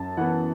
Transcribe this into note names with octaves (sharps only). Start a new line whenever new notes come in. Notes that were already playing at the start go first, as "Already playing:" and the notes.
Already playing: F#2 A5
E3 B3 F#5